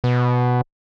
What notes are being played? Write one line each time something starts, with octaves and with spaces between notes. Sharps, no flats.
B2